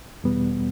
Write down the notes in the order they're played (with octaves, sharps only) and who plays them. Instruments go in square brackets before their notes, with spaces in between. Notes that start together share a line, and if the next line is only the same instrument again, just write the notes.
[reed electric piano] E2 B2 G3 B3